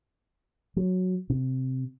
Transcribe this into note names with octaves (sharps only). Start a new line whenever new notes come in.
F#3
C3